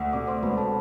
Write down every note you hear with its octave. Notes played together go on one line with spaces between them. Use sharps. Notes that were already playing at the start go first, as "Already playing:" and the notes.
Already playing: D2
C3 D5 D6
C5 C6
E1 B4 B5
A4 A5